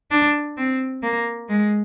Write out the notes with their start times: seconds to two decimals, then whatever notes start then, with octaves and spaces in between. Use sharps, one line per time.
0.11 D4
0.57 C4
1.03 A#3
1.49 G#3